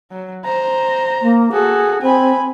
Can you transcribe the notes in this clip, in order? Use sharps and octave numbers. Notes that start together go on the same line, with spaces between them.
F#3
C5 A#5
A#3
F#4 G#4 A4
C4 G#5 B5